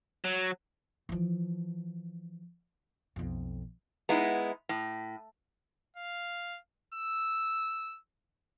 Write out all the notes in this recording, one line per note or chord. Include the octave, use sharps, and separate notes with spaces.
F#3
E3 F3
B1 F2
G#3 B3 D#4 E4
A2
F5
E6